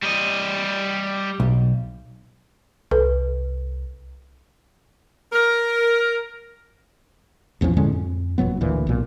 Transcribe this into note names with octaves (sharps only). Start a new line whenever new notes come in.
G3 D#5
B1
C2 A4 B4
A#4
A1 E2 F3 C#4
A2 D3 G#3 C#4
F2
F#1 A#2 F#3 B3
D2 A#2 E3
B1 A#2